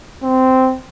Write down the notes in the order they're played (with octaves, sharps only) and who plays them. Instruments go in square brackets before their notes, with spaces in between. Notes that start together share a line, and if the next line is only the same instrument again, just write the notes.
[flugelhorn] C4